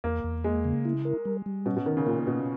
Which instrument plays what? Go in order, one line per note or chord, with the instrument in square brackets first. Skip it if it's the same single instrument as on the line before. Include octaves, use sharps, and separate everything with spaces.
[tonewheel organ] E2 [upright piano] A#3
[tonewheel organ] E2
[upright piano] G#3 [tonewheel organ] A#3
[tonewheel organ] C#3
E4
A#4
G3
G3
[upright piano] B2 [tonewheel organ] C#4
[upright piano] B2
[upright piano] D#3 [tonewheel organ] A#4
[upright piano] C#3
[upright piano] A#2 [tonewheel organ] A#3
[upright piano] B2 [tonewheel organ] C#4